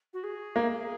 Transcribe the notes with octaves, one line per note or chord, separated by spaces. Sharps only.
F#4
G#4
A#3